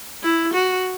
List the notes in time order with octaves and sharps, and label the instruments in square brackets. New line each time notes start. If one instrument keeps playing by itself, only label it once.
[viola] E4
F#4